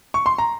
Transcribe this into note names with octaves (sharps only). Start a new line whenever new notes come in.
C#6
C6
A#5